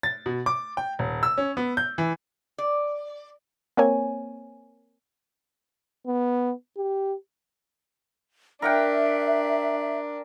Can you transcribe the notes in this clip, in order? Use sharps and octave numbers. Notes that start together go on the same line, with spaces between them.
A6
B2
D6
G5
D#1
E6
C#4
B3
G6
E3
D5
A#3 C4 A#4 C#5 G#5
B3
G4
D4 A#4 E5 F#5 G5